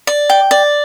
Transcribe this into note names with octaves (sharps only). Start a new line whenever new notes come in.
D5
G5
D5